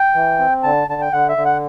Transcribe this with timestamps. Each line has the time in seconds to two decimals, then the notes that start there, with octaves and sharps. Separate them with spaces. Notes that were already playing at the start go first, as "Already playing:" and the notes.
Already playing: G5
0.14 E3
0.39 C4
0.63 D3 A5
0.88 D3 A5
1.01 G5
1.12 D3 F#5
1.29 E5
1.37 D3
1.45 F#5